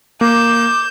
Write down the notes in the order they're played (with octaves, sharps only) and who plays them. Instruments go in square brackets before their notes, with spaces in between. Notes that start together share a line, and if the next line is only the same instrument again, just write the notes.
[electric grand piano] A#3 [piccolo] D6 [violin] G6 E7